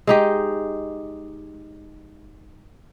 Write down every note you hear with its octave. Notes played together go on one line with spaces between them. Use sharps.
G#3 D#4 G4